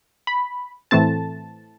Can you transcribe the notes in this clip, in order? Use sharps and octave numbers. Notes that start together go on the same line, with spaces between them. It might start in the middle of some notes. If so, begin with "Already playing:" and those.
B5
A2 E3 A3 C4 A5